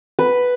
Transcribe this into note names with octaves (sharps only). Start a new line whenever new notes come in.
B4